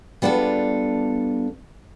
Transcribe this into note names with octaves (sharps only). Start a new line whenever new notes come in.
G3 B3 D4 F4 A4